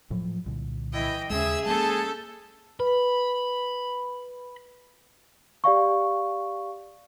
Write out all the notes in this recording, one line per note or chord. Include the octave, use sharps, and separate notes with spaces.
A2 F3 F#3
C2 A#2 D3
E3 E4 D#5 G5
D#2 C#3 G#3 C#4 G#4 E5 E6
G#3 A#3 C#4 A4 A5 G6
B4 B5
G4 D5 F5 C#6